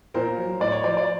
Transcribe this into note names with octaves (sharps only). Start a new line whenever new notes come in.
A#2 A#4 C5
F#3
A2 D5
C#5
F3 C5 D5
D5